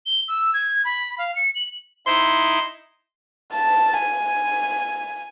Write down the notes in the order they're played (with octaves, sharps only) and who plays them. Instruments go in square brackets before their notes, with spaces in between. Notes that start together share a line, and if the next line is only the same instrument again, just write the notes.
[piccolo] G7
E6
G#6
B5
F5
C#7
F#7
[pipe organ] D#4 E4 [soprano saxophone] C6
[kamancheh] A5
G#5